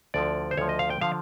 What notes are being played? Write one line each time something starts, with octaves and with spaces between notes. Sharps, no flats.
D2 D3 F3 D5
C5
D2 D3 F3 C#5
D#5
F5
G5
D3 F3 F5